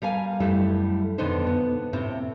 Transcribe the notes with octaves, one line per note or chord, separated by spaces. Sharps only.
G3 A#4 F5 G#5
F#2 G3 A3 E4
F2 B2 D3 D#3 D#4 C5
B3
A2 C3 C4